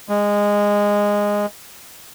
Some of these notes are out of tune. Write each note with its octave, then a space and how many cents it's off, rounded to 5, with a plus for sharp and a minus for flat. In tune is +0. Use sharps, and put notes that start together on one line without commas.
G#3 -15